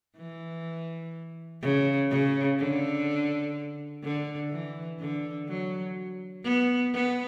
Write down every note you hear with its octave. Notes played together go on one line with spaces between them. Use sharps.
E3
C#3
C#3
D3
D3
E3
D3
F#3
B3
B3